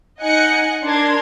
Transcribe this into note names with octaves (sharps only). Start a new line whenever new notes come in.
D#4 D#5 F#5 G#5 F#6 C#7
D4 A#4 C6 G#6